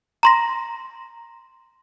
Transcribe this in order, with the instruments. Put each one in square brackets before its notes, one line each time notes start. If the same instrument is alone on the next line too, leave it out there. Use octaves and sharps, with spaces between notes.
[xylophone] A#5 C6 A#6